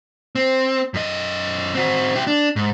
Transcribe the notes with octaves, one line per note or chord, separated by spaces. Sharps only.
C4
F#2 D#5
C4 F#4
E4 G4
D4
G#2